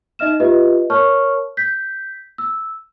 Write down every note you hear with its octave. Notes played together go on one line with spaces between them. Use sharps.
D#4 D#5 E5 F6 E7
F4 G4 B4 D#5 E5
A#4 C#5 A5 C#6 F6
G6 B6
E6